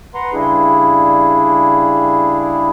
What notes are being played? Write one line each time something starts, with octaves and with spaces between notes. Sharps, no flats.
B4 F#5 A#5 C6
C#3 G3 D4 E4 G#4